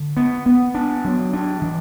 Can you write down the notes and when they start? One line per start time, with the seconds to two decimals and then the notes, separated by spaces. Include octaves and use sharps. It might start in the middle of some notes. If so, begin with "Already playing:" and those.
Already playing: D3
0.17 B3
0.46 B3
0.75 D4
1.04 F#3
1.33 D4
1.62 E3